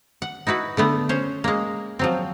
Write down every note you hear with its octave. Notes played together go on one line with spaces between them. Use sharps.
F#5
D#4 E4 F#4 B4
D3 A3 B3
C#4 C5
G#3 A#3
F3 F#3 C4